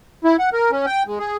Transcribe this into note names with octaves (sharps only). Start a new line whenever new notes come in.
E4
F#5
A#4
C#4
G5
G#3
G#4